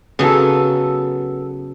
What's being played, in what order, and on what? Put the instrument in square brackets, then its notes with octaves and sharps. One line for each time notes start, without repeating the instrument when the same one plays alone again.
[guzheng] C#3 F#3 [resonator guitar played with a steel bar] B3 A4